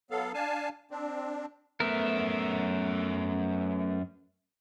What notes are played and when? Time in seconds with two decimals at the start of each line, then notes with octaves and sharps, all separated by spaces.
0.11 F#3 B3 A4 F5
0.34 D4 F5 G#5 A5
0.91 C4 D4
1.80 F#2 A3 B3 A#4 E5